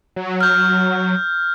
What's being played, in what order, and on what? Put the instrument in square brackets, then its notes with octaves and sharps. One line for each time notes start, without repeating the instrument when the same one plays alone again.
[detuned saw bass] F#3
[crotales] F6 G6